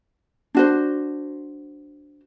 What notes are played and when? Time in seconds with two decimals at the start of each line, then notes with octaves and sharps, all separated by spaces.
0.55 D4 F#4 C5